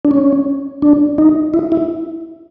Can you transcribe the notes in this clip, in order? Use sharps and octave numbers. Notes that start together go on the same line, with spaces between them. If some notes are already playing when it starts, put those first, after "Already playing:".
D4
C#4
D4
D#4
E4
E4